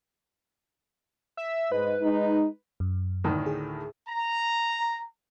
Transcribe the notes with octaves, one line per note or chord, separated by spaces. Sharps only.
E5
G#2 B4 D#5
G#3 D#4
F#2
D2 A2 D#3
G#4
A#5